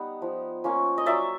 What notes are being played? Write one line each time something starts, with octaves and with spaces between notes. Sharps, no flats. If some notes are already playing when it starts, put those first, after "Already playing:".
Already playing: G3 B3 D#4 F#5
F3
A#3 C#4 F4
D#5
F#3 D5 E5